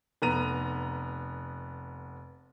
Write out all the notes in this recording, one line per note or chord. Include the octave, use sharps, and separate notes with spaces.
F1 B3 A#5 D#7